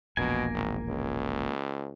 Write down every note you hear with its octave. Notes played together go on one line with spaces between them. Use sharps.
E1 A#1 B2 A#3 B3 A#4 G#5
G#1
C#2